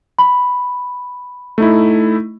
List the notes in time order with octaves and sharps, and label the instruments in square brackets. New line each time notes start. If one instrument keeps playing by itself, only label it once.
[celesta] B5
[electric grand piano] A3 D#4 E4